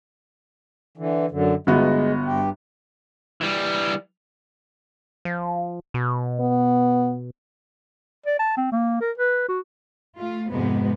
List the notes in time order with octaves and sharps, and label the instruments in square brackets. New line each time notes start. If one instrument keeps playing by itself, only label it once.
[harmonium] D3 E3
F#2 D3
[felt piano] G1 B3 F#4 [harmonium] G#3
[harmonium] G2 G4
[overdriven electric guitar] E3 G3
[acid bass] F3
B2
[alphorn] B3
[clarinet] D5
A5
C4
A#3
A#4
B4
F#4
[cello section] A3 F4
F2 G#2 C3 G#3 B3